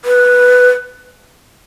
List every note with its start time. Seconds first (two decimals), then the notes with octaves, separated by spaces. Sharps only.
0.05 B4